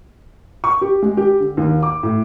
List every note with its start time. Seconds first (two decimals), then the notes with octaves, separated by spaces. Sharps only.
0.64 C#6
0.81 G4
1.02 G#3
1.17 G4
1.40 D3
1.57 D#2
1.83 D6
2.03 A2